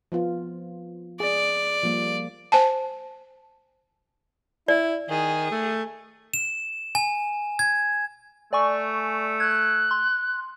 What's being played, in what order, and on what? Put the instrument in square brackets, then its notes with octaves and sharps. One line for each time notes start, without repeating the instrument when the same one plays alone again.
[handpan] F3 B3 F4
[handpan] G#4 [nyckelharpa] D5
[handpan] F3 G3 A#3
[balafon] C5 G#5 A5
[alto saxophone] E4 [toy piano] D5
[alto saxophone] D#3 [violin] G#4
[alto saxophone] A3
[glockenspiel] E7
G#5
G#6
[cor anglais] A3 [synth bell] D5 G#5 C#6
[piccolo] F#6 [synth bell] G#6
[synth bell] C6